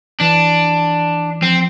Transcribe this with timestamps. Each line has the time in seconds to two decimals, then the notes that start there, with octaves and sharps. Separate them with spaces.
0.20 E3 D4
1.42 F3 C4